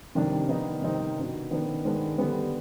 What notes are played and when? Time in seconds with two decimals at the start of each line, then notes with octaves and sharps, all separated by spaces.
0.15 C3 D#3 G3 D4
0.48 D#3 B3 D#4
0.82 C3 D#3 G3 C4 D#4
1.16 B2 B3 D4
1.51 D#3 B3 D4
1.85 D#3 G#3 B3 D4
2.18 D3 G3 B3